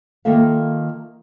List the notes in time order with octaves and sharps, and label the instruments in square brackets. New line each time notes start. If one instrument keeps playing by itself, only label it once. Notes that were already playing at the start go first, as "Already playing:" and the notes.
[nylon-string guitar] D#3 A#3 F4 A4 E5 F5